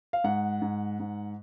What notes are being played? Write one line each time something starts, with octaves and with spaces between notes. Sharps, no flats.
F5
G#2 F#5
G#2
G#2